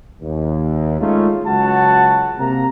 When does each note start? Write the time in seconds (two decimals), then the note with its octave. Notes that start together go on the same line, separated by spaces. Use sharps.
0.21 D#2
1.00 G#3 A3 C#4 D#4 F4
1.47 C#2 F#3 F#4 F#5 A5
2.38 C3 A#3 A#5